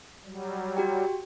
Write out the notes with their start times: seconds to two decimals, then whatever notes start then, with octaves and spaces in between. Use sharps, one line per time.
0.25 F#3 G3
0.77 F#4 G4 G5